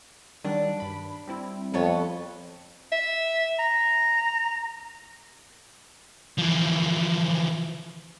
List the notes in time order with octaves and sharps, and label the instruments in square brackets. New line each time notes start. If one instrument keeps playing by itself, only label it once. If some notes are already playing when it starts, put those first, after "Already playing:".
[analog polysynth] D#3 F#3 G3 [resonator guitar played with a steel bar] D4
[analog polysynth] G2 B5
G3 C4 E4
[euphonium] F2 [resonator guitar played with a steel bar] B3 A4 C#5
[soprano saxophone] E5
A#5
[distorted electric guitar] E3 F3